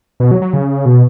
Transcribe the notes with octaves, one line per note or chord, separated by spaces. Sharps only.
B2
F#3
F#3
C#3
B2